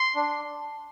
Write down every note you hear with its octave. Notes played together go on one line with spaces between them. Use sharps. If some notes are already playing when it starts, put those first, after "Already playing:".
Already playing: C6
D4